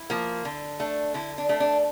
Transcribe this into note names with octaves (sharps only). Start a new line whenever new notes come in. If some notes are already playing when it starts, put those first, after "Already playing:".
Already playing: E4
F3 A#3
D3
A3 D4
D3 E4
D4
A3 D4
D4